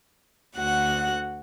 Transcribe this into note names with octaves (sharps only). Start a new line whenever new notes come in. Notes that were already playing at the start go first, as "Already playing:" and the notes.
D2 F#4 F#5 F#6